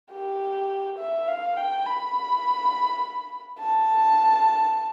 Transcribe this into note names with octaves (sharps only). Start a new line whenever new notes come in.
G4
E5
F5
G5
B5
A5